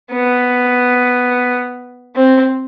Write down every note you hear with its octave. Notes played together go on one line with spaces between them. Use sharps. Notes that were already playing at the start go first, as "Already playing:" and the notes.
B3
C4